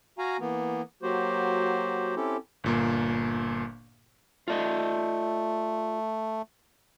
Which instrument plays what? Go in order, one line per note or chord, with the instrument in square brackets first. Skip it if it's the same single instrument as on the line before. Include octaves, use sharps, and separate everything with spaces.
[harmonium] F#4 F5 G#5 A#5
E3 A#3 B3
F#3 A#3 F#4 G4 C5
C4 C#4 E4 G4 A4
[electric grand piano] G1 A#2 A#3
[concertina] A3 [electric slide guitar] F4 D5 D#5